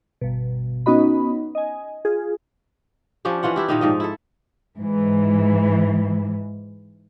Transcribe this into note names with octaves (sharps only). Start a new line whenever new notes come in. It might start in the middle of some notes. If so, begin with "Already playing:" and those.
G1 B2
B3 C#4 D#4 F#4 D#5 B5
D#5 G#5
F4 G#4
F3 C#4 D4 G4
E3 C#4 F4 F#5
D4 E4 G4
A#2 D#3 D#4
G#2 F3 D#5
E4 A4
G#2 E3